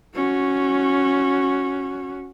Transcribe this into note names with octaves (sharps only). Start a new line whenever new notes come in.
C#4 F#4